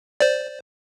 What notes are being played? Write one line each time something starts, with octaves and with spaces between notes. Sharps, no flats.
C5 D5